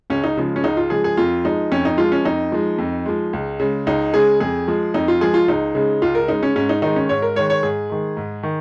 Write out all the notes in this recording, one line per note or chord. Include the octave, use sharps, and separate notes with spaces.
C#2 C#4
D#4
C#3 F3 G#3
C#4
C#2 D#4
F4
C#3 F3 G#3 G#4
G#4
F2 F4
F3 G#3 D#4
F2 C#4
D#4
F3 G#3 F4
C#4
F2 D#4
F3 G#3
F2
F3 G#3
C#2
C#3 G#3
C#2 D#4
C#3 G#3 G#4
F2 G#4
F3 G#3
F2 D#4
F4
F3 G#3 G#4
F4
C#2 D#4
C#3 G#3
C#2 F4
A#4
C#3 G#3 D#4
C#4
G#2 C#4
D#4
D#3 G#3 D#4
C#4
G#2 C#5
A#4
D#3 G#3 C#5
C#5
G#2 G#4
D#3 G#3
G#2
D#3